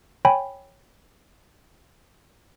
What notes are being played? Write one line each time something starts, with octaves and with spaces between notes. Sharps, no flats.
C#5 G5 G#5 B5